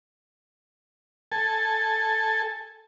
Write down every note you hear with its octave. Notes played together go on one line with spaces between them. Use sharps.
A4 G#5 A5